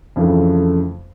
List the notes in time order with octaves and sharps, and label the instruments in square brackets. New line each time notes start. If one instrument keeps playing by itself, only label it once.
[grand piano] F2 C#3 E3 A3